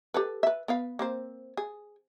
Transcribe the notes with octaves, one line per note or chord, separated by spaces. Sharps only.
G4 A4 B4
B4 E5
B3 B4 F5
A#3 C4 C5
G#4